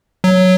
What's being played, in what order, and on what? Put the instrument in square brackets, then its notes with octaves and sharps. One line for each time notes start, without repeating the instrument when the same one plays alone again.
[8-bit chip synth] F#3